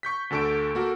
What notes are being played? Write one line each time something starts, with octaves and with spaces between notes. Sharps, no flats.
C#6 G6 B6
D2 D3 A4 C#6 D7
A#3 F#4 A4